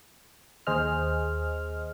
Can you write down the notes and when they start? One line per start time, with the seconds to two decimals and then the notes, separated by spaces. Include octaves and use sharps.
0.67 D#2 G#4 C5 D#5 F6